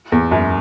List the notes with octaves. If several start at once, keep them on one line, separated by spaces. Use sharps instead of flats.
E2
F#2